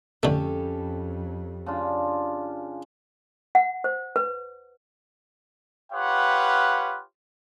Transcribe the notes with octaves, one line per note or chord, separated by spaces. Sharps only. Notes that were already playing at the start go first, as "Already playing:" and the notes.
F2 D3 A3 C#4 G4 A4
C#3 D4 F4
F#5
C5
B4
F4 G4 B4 C#5 F5 F#5